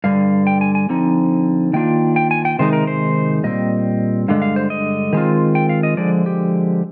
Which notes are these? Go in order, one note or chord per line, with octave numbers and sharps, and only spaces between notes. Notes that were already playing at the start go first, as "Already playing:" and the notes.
G2 D3 G3 F5
G5
G#5
G#5
D3 F3 C4 D#4
D#3 A#3 D4 F4 G5
G5
G#5
G5
C3 D#3 G#3 D#4 C5
A#4
C5
A#2 G3 C4 D#5
G2 D3 G#3 F5
F5
C5
D#5
D#3 G#3 C4 F4
G5
F5
D#5
D3 F3 G#3 D5
G4